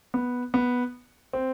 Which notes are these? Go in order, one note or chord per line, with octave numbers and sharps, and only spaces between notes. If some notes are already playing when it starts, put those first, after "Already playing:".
B3
B3
C4